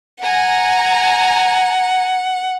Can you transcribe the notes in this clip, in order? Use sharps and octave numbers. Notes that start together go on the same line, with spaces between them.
F#5 G#5 A#5